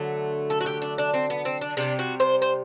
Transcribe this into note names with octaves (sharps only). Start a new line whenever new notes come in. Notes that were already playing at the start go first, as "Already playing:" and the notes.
Already playing: D3 F#3 A3
A4
F#4
G4
D4
D4
C4
B3
C4
D4
C3 G3 D4
F#4
C5
C5